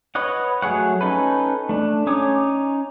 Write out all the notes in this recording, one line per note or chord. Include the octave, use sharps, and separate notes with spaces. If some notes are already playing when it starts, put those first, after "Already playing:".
B4 C#5 D#5 F#5
F#3 A3 G#4 C#5 F#5
C#4 D#4 A4 B4
A3 D4
C#4 D#4 C#5 D6 D#6